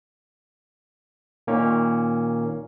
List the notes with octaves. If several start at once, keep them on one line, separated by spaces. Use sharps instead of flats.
A#2 D#3 A#3 C#4